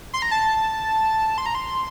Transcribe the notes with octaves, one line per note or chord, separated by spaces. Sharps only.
C6
A#5
A5
C6
A#5
C6